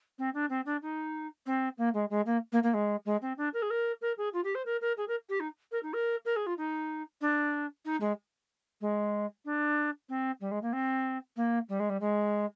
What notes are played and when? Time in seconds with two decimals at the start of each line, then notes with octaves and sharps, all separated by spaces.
0.19 C4
0.34 D4
0.50 C4
0.66 D4
0.82 D#4
1.46 C4
1.78 A#3
1.94 G#3
2.10 G#3
2.26 A#3
2.52 A#3
2.63 A#3
2.74 G#3
3.05 G#3
3.22 C4
3.38 D4
3.54 A#4
3.62 G#4
3.70 A#4
4.01 A#4
4.18 G#4
4.33 F4
4.44 G4
4.55 C5
4.66 A#4
4.81 A#4
4.97 G#4
5.08 A#4
5.29 G4
5.40 D#4
5.72 A#4
5.83 D#4
5.93 A#4
6.25 A#4
6.36 G#4
6.46 F4
6.58 D#4
7.21 D4
7.85 D#4
8.01 G#3
8.81 G#3
9.45 D4
10.09 C4
10.41 G3
10.51 G#3
10.62 A#3
10.73 C4
11.36 A#3
11.69 G3
11.80 G#3
11.89 G3
12.01 G#3